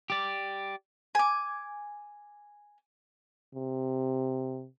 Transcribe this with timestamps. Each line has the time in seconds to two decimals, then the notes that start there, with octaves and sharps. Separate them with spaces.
0.10 G4 D5
1.15 G#5 D6
3.55 C3